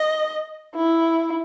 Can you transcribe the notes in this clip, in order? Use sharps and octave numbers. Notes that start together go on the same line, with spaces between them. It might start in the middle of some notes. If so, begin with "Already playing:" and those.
Already playing: D#5
E4